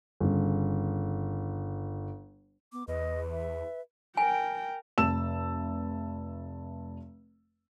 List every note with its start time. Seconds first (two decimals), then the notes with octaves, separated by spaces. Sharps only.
0.20 G1 C#3
2.73 B3 D6
2.88 E2 B4 D#5
3.31 E5
4.17 A#4 G5 G#5
4.98 F1 A5 E6 E7